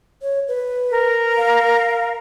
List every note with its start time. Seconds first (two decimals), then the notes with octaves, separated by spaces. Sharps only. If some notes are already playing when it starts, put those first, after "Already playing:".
0.22 C#5
0.48 B4
0.91 A#4
1.37 F5